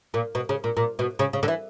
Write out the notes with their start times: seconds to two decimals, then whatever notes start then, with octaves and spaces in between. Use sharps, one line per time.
0.14 A#2
0.35 B2
0.49 C#3
0.64 A#2
0.77 A#2
0.99 B2
1.19 C#3
1.33 C#3
1.43 D3
1.48 E3